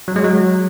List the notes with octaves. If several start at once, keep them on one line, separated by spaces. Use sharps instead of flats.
F#3
G#3
F#3